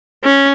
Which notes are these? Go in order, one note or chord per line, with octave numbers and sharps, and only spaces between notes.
C#4